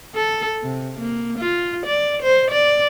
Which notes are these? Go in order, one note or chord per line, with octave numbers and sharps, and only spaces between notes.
A4
C3
A#3
F4
D5
C5
D5